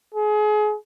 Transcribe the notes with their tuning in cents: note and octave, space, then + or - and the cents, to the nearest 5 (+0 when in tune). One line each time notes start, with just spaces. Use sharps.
G#4 +30